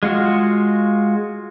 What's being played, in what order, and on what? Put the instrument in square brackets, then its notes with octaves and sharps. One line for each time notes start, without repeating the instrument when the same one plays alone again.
[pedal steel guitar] G#3 F4 F#4 F6